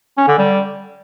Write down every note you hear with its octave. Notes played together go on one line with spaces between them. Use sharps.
C#4
D3
G3